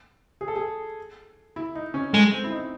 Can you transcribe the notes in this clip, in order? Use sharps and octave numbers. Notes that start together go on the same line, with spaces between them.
G#4
A4
G#4
E4
D#4
C#4
G#3 A3
C4
E4
D#4